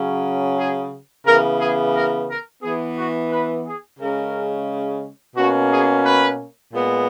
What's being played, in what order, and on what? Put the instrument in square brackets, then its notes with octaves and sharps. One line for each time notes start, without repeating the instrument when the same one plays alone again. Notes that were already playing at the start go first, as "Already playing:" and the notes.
Already playing: [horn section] C#3 F#3 C#4
G#4
C#3 E3 B3 A#4
G#4
A#4
A#4
E3 B3 G#4
F#4
B4
G#4
C#3 G#3 C#4 A#4
B2 A#3 C#4 F#4
G#4
B4
A#2 G#3 B3